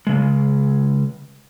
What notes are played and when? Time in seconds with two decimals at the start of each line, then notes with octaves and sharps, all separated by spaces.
0.07 C#3 G#3